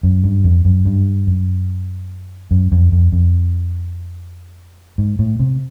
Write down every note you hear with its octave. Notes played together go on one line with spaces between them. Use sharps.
F#2
G2
F2
F#2
G2
F#2
F#2
F2
F2
F2
G#2
A2
C3